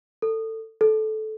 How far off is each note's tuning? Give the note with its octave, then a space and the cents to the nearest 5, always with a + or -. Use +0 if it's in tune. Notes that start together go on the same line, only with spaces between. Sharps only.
A4 +20
A4 -20